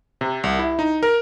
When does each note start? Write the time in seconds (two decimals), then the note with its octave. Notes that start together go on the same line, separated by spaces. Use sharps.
0.21 C3
0.44 C2
0.59 E4
0.79 D#4
1.03 A#4